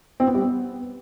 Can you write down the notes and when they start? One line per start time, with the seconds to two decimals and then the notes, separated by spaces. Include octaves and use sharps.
0.20 C4
0.27 B3
0.35 G3
0.42 B3